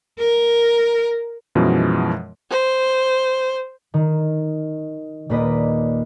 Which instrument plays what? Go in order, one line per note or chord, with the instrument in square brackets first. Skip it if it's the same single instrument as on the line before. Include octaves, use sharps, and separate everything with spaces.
[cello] A#4
[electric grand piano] F#2 B2 E3 F3 G#3
[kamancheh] C5
[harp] D#3
D#1 A#3 B4 D5 D#5 B6